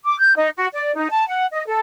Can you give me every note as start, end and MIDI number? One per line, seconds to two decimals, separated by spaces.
0.04 0.18 86
0.19 0.33 91
0.36 0.48 63
0.57 0.67 66
0.74 0.95 74
0.95 1.07 63
1.10 1.26 81
1.27 1.45 78
1.52 1.63 75
1.66 1.79 69